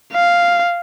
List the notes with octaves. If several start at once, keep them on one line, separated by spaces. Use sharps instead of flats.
F5